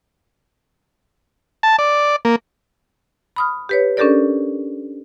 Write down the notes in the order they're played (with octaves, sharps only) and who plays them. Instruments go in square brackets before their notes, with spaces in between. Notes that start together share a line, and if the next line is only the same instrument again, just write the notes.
[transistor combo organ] A5
D5
A#3
[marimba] B5 D#6 F6
G4 B4 C#5
C#4 D4 G4 A4 A#4 D5